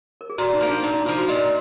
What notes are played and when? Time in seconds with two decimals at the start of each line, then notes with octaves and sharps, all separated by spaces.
0.21 A#4
0.30 G#4
0.38 A#2 F#4
0.53 D#4
0.61 F3 A#3
0.68 D4
0.83 A#2 D#4
0.94 D#4
1.05 F3 A#3 F4
1.18 F#4
1.28 A#2 B4 D#5